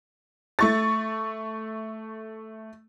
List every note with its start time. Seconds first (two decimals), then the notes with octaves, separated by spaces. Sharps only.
0.59 A3 C#6 A6